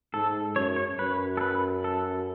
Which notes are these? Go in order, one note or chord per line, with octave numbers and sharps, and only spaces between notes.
G#2 A4
F#2 C#5
C#5
F#2 B4
A4
B4
A4